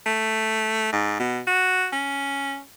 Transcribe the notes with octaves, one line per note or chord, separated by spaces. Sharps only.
A3
G#2
B2
F#4
C#4